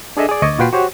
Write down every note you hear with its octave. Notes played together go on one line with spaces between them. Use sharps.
D4 G#4 A4 D#5 E5
G#4 D5
D2 D#5 C#6 D6 G#6 A6
A#2 F4 F#4 B4 G5 C6
F#4 G4 C5 C#5